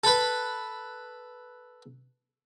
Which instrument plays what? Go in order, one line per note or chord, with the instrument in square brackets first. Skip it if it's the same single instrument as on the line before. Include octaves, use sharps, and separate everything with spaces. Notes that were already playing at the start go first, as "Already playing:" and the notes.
[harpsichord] A4 B4